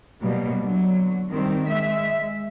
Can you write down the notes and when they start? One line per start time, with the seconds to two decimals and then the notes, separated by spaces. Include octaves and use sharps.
0.20 B2 F#3 G3 A#3
0.63 D3 F#3
1.31 D#3 G3 C4
1.65 G#3 E5